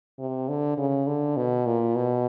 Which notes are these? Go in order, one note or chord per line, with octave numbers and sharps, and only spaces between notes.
C3
D3
C#3
D3
B2
A#2
B2